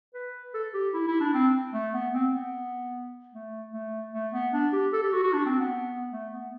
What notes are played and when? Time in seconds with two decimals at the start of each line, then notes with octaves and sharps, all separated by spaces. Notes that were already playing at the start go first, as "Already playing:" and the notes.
0.14 B4
0.54 A4
0.74 G4
0.94 E4
1.07 E4
1.21 D4
1.34 C4
1.74 A3
1.93 B3
2.14 C4
2.34 B3
3.34 A3
3.73 A3
4.14 A3
4.33 B3
4.53 D4
4.73 G4
4.93 A4
5.03 G4
5.13 F#4
5.23 F#4
5.33 D4
5.46 C4
5.59 B3
6.13 A3
6.33 B3